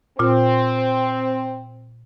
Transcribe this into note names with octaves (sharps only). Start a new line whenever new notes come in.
A#2 C4 F4